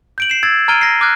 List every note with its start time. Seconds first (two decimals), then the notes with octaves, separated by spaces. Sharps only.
0.18 G6 D7 F#7
0.30 C7 E7
0.43 E6 G#6 A6
0.68 A#5 F6 G#6 D7 D#7 G7
0.81 A#6 C7
1.01 D6 F6 F#6 G#6